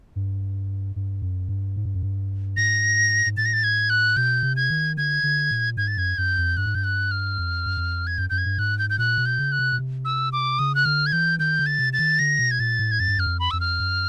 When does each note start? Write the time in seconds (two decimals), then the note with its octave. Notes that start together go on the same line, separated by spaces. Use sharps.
0.16 G2
0.96 G2
1.22 F#2
1.49 G2
1.76 G#2
1.85 G2
1.94 F#2
2.02 G2
2.56 G#2 A#6
3.26 G#2
3.37 A2 A6
3.46 A#6
3.53 A6
3.64 G#6
3.90 F#6
4.17 B2 G6
4.43 C3
4.56 G#6
4.70 D#3
4.97 D3 G#6
5.23 D3
5.51 A#2
5.77 G#2 G#6
5.88 A6
5.97 F#2 G#6
6.18 F#2 G6
6.37 F2
6.57 G2 F#6
6.66 G#2
6.75 G2 G6
6.84 F#6
7.11 F6
7.38 F2
7.66 F#2
7.77 F2
8.07 G#6
8.18 F#2 G6
8.30 F#2 G6
8.38 G#6
8.45 G2
8.58 G#2 F#6
8.79 G6
8.90 G6
8.98 A#2 F#6
9.18 B2
9.26 G6
9.39 C#3
9.52 F#6
9.59 C3
9.72 B2
9.79 C3
10.05 E6
10.33 D6
10.59 C#3 D#6
10.75 F#6
10.85 D3 F6
11.06 G#6
11.12 E3 G6
11.39 D#3 G6
11.59 D3
11.66 A6
11.79 C3
11.93 A6
11.99 D#3
12.19 D3 A#6
12.39 B2
12.51 G#6
12.59 A#2 A6
12.79 A2
12.91 G#6
13.00 F#2 A6
13.08 G2
13.17 F#2 F6
13.26 F2
13.40 B5
13.51 F2 E6
13.60 F6
13.80 F#2